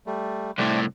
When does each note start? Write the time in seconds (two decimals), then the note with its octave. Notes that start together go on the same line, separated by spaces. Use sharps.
0.06 G3 A3
0.58 C2 A2 A3 C4 D5